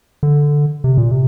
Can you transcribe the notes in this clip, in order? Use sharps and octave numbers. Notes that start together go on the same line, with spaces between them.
D3
C3
A#2
C3